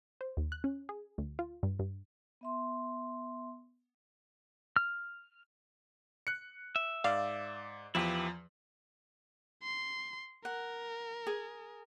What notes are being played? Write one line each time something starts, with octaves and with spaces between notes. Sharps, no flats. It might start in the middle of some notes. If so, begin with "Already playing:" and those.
C5
D#2
F#6
C#4
G#4
D2
F4
G2
G2
B3 E5 C6
F6
F#6 C#7
E5
G#2 D5 F5
E2 F3 E4 G4 B4
C6
A#4 F#5
G#4